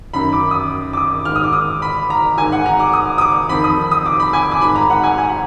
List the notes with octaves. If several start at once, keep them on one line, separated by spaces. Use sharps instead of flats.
F#2 D#3 B5
D6
D#6
D6
D#6
G#2 D#3 F6
D#6
D6
D#6
B5
A#5
G#2 D#3 G#5
F#5
A#5
D6
D#6
D#6
D6
F2 D#3 B5
D#6
D#6
D6
B5
G#5
D6
G#2 D#3 B5
A#5
F#5
G#5
G#5
F#5